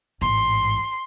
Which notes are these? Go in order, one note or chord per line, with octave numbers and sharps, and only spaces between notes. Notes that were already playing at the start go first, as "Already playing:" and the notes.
A1 G#2 C6